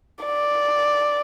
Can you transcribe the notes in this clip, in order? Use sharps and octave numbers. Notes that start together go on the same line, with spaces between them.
D5